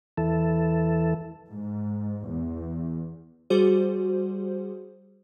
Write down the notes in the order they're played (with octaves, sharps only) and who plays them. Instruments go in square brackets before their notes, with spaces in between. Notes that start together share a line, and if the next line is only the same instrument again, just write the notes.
[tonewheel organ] E2 E3 A4
[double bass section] G#2
E2
[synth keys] G3 F#4 G#4 C5